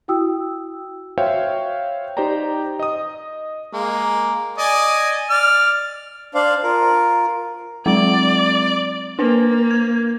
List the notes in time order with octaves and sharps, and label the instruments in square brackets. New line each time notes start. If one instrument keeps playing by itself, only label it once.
[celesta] E4 F#4 G5 D#6 E6
[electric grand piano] F#4 C5 C#5 E5 F5 G5
D#4 G4 C5 D5 G5 A#5
D#5 D#6
[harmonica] G#3 A#3
D5 D#5 G#5
D5 F6
[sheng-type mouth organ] D4 C5 D5 F5
F4 A#4
[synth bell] F#3 G#3 C4 [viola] D5
[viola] A#3 [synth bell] D4 B4 C5
[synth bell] G#6